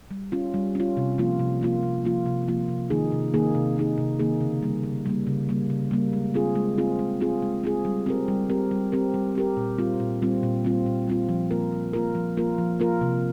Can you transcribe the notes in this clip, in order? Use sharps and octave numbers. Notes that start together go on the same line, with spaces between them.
G3
C#4 F4
G3
C#4 F4
C3
F3 A#3 F4
C3
F3 A#3 F4
C3
F3 A#3 F4
C3
F3 A#3 F4
C3
D#3 A#3 D#4 G#4
C3
D#3 A#3 D#4 G#4
C3
D#3 A#3 D#4 G#4
C3
D#3 A#3 D#4 G#4
C#3
G3 A#3
C#3
G3 A#3
C#3
G3 A#3
C#3
G3 A#3
G#3
C4 F4 G#4
G#3
C4 F4 G#4
G#3
C4 F4 G#4
G#3
C4 F4 G#4
G3
C4 G4 A#4
G3
C4 G4 A#4
G3
C4 G4 A#4
G3
C4 G4 A#4
A#2
G3 C4 F4
A#2
G3 C4 F4
A#2
G3 C4 F4
A#2
G3 C4 F4
F3
A#3 F4 A#4
F3
A#3 F4 A#4
F3
A#3 F4 A#4
F3
A#3 F4 A#4
C3